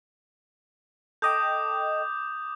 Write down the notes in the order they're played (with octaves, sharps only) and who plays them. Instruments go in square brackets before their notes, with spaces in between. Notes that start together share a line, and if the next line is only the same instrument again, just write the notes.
[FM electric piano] A4 D#5 G5 [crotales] D6 D#6 G6